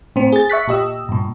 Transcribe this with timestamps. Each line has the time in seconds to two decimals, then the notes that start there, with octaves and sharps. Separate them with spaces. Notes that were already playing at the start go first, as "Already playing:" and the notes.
0.16 A2 C4
0.32 G#4 A6
0.50 E5 C#6 F#6 B6
0.67 A#2 G4 D#5 E6
1.09 G2 A#2